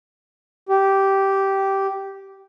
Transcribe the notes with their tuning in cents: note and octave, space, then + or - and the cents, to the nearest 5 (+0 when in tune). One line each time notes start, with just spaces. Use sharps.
G4 -10